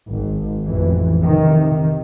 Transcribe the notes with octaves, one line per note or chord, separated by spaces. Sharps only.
G#1
A1 F2 E3
C3 D#3